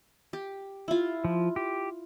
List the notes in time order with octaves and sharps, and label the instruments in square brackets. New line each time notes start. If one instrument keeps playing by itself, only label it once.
[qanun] G4
E4 F4
[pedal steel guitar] F3
G4